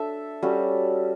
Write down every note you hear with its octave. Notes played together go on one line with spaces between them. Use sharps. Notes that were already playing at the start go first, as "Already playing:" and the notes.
Already playing: D4 A4 E5
G3 C#4 F#4 A4